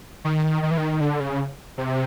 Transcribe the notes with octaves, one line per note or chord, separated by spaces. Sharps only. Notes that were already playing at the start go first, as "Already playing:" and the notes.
D#3
D#3
E3
D#3
D3
C#3
C3